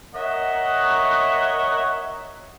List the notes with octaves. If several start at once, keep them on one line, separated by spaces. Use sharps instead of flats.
A#4 C#5 D#5 E5 F#5